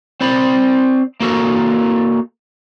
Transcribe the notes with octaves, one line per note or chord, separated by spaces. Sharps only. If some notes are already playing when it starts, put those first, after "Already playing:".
C4 C5 D5 B5
A#3 F#4 A4 A#4